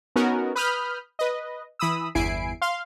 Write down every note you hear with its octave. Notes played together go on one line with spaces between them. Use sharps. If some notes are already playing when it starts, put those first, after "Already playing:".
B3 C#4 D#4 F#4 A#4
B4 B5 D#6 F6 G6
B4 D#5
E3 B5 D#6 E6
G1 E2 E4 G#5 C7 D7
F5 C6